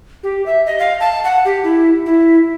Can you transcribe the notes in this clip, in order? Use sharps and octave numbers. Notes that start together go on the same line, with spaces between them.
G4
E5
D#5
F5
A5
F#5
G4
E4
E4